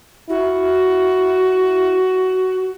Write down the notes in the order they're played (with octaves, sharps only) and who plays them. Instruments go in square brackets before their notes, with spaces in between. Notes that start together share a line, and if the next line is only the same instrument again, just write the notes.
[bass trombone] E4 [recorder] F#4